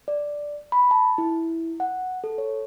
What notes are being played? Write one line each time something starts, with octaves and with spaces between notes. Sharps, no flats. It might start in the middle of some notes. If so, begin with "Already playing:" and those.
D5
B5
A5
E4
F#5
A4
C#5